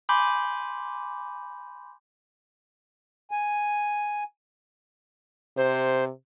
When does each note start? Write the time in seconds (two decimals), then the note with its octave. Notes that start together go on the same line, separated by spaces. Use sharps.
0.09 G#5 B5 C6 D6 G6
3.31 G#5
5.57 C3 C5